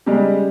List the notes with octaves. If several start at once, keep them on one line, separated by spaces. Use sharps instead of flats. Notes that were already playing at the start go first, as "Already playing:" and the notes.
C#3 G3 G#3 G4